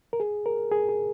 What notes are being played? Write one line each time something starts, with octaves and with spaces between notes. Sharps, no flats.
A#4
G#4
A#4
G#4
G#4